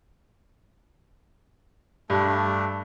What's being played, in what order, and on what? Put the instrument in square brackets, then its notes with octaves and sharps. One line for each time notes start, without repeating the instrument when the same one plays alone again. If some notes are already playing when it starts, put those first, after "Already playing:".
[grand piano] G2 [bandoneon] A3 D4